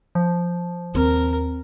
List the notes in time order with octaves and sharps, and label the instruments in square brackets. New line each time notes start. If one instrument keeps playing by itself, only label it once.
[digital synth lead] F3
[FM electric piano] D#2 [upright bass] C4 [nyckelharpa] A#4